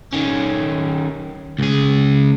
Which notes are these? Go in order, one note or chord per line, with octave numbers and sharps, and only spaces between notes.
D#3 C#4
C#2 G#4